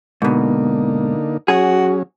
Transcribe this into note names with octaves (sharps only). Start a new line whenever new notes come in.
G#2 B2 D3 A#3 D#4
F#3 C#4 F#4 G#4